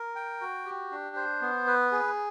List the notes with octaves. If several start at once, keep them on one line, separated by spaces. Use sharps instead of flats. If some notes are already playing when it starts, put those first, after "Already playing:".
Already playing: A#4
G5
F#4
G4
D4
C5
B3
B4
G#4